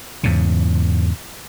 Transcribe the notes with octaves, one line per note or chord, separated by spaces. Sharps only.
E2 G#2 C#3